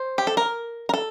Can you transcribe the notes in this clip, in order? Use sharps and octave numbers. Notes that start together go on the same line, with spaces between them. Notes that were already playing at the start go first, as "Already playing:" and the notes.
Already playing: C5
G4
A4
A#4
A#4
A4